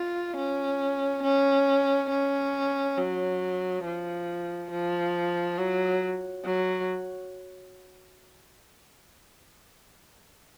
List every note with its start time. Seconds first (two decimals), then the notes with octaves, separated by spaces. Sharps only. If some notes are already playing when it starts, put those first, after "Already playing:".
Already playing: F4
0.37 C#4
1.23 C#4
2.10 C#4
2.98 F#3
3.84 F3
4.72 F3
5.58 F#3
6.45 F#3